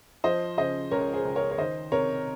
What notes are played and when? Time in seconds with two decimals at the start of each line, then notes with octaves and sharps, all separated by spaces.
0.24 F3 C5 D#5
0.57 C#3 C5 D#5
0.91 C#2 A#4 C#5
1.13 G#4 C5
1.25 C#2
1.36 A#4 C#5
1.51 C#5
1.58 D#3 C5 D#5
1.92 C3 A#4 C#5